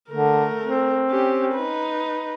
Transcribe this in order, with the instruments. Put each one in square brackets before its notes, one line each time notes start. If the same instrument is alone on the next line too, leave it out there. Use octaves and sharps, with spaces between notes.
[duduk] D3 [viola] A3 A#4
[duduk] C4
[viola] C#4 G4
D#4 B4